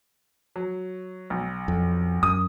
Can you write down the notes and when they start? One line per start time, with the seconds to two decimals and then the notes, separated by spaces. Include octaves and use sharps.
0.56 F#3
1.30 B1
1.68 F2
2.23 F#2 D#6